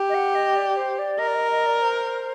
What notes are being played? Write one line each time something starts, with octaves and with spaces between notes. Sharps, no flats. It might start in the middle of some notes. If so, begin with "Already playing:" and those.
Already playing: G4
D#5
F#5
D#5
D5
C5
D5
A#4 D#5
D5
D#5
D#5
D5
C5